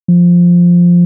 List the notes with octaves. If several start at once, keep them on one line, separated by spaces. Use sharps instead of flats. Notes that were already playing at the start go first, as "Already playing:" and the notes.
F3